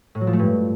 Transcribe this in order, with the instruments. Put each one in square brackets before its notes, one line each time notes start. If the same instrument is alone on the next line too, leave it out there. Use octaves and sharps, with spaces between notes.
[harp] A2
F#3
F3
A3
G2